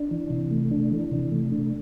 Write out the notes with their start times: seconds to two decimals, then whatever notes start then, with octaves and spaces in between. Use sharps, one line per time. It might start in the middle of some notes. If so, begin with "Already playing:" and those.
Already playing: D4
0.11 E3
0.30 C3
0.51 A3
0.71 D4
0.91 E3
1.11 C3
1.31 A3
1.52 D4